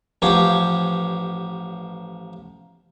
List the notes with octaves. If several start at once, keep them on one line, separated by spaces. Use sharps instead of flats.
A1 F3 F#4 G4 C#5